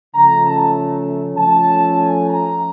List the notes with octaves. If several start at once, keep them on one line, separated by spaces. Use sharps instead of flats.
C#3 F3 A3 C#4 A#5
A5
F3 A3 C#4 A5
G#5
A#5